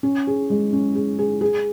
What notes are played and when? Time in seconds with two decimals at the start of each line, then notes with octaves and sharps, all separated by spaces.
0.03 C#4
0.27 G#4
0.50 G#3
0.73 C#4
0.95 G#4
1.19 G#4
1.41 G#4